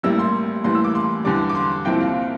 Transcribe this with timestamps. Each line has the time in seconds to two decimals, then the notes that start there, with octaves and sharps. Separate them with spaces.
0.03 A1 A2 G3 A#3 E4 E6
0.19 C6
0.64 A2 E3 G3 A#3 C6
0.75 E6
0.84 D6
0.95 C6
1.24 E2 D3 G3 D6
1.49 D6
1.55 C6
1.85 C2 A#2 F3 C4 E4 G5
2.01 F5